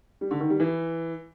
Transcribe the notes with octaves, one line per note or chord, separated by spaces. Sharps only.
G3
D3
D#3
G3
E3